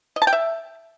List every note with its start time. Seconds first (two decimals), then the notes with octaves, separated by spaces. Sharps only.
0.16 D#5
0.22 A5
0.27 G5
0.33 E5